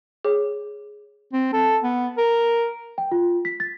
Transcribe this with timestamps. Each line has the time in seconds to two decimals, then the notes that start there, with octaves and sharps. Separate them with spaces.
0.25 G#4 C#5
1.33 C4
1.53 A4
1.83 B3
2.18 A#4
2.98 G5
3.12 F4
3.45 B6
3.60 A6